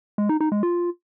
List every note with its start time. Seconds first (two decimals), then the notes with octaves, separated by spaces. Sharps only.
0.18 G#3
0.29 D#4
0.40 D#4
0.52 G#3
0.63 F4